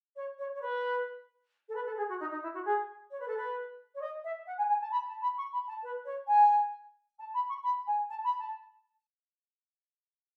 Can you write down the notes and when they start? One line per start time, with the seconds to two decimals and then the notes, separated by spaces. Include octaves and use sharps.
0.16 C#5
0.38 C#5
0.54 C#5
0.61 B4
1.68 A4
1.74 B4
1.85 A4
1.97 G#4
2.08 F#4
2.20 D#4
2.31 D#4
2.42 E4
2.54 F#4
2.65 G#4
3.10 C#5
3.19 B4
3.27 A4
3.37 B4
3.94 C#5
4.01 D#5
4.24 E5
4.46 F#5
4.57 G#5
4.69 G#5
4.81 A5
4.91 B5
5.06 A5
5.21 B5
5.37 C#6
5.52 B5
5.67 A5
5.82 B4
6.05 C#5
6.27 G#5
7.18 A5
7.34 B5
7.48 C#6
7.63 B5
7.87 G#5
8.09 A5
8.24 B5
8.38 A5